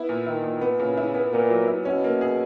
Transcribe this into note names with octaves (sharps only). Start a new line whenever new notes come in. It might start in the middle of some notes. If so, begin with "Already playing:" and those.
Already playing: B3 E4
A#2
D#3 E4
A#2
B3
A#2 C#3
E4
B3
A#2 B3
F#3
E4
B2 C#4
A#3
G#4